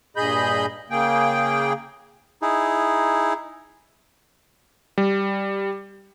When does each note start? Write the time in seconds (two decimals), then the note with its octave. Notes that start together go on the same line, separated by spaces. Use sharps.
0.17 G2 A#2 G#4 D#5 B5 G6
0.90 C#3 A#3 G#4 G5
2.42 D#4 E4 G#4
4.98 G3